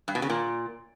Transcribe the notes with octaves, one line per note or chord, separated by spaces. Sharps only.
G2
B2
C#3
A#2